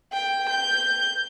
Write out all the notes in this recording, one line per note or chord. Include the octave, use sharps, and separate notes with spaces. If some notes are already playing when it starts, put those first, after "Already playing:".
G5
G6